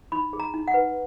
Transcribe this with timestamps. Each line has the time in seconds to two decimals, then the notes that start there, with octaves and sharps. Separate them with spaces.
0.12 D#4 B5
0.33 G#4
0.40 A#5
0.54 D#4
0.68 F#5
0.74 B4